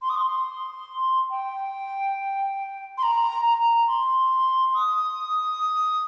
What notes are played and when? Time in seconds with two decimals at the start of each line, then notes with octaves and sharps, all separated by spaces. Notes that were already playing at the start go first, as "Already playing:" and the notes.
0.02 C6
0.09 D#6
0.17 C6
1.30 G5
2.98 C6
3.03 A#5
3.45 A#5
3.88 C6
4.74 D#6